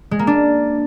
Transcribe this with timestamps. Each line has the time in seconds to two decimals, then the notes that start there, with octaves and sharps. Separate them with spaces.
0.11 G#3
0.19 A#3
0.27 D4